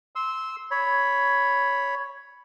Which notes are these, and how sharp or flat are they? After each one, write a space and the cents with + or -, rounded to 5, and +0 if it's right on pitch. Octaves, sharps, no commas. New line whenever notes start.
C6 +0 E6 -15
C#5 +5 B5 +0